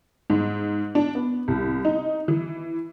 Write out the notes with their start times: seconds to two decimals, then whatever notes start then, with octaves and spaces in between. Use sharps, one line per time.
0.30 G#2
0.95 D4
1.15 B3
1.48 C2
1.85 D#4
2.28 E3